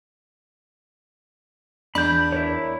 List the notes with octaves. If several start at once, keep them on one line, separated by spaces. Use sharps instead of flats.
E2 D4 B5 G6
E4 A#4 C#5